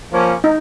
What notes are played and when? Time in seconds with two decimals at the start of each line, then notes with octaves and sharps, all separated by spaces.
0.13 F3 A#3 C#4
0.44 D#4